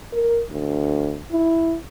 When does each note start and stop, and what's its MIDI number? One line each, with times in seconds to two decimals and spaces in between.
0.13 0.42 70
0.51 1.17 38
1.32 1.76 64